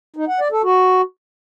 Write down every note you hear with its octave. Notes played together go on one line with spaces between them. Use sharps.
D#4
F#5
D5
A4
F#4